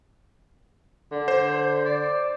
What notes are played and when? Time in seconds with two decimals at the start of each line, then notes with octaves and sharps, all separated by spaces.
1.12 D3
1.28 C5
1.86 D5